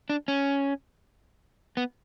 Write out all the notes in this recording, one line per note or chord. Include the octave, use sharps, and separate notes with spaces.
D4
C#4
B3